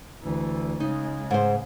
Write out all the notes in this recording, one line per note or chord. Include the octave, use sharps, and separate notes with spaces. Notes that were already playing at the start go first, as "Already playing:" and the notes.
D2 E3
C#3 G#3 D#4
G#2 C5